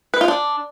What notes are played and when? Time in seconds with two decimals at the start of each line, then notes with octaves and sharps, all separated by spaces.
0.14 B4
0.21 F4
0.28 D4